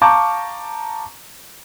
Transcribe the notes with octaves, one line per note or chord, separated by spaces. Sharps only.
F5 A5 A#5 C#6 D6 G6